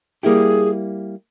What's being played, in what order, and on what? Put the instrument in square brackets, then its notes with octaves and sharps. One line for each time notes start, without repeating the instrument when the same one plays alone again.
[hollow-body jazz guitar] G3 A#3 E4 G4 [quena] G#4